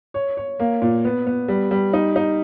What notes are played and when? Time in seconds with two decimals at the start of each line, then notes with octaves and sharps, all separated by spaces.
0.14 C#5
0.37 C#5
0.59 A#3
0.82 A#2
1.05 B3
1.27 B3
1.48 G3
1.71 G3
1.93 D#4
2.16 D#4